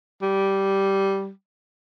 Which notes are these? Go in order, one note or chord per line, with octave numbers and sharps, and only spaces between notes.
G3